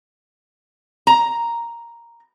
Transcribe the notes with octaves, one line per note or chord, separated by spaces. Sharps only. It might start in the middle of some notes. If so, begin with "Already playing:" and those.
A#5